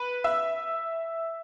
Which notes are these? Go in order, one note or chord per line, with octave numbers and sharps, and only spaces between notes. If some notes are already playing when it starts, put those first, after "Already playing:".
Already playing: B4
E5